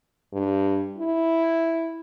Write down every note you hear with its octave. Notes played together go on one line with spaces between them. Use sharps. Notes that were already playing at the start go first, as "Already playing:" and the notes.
G2
E4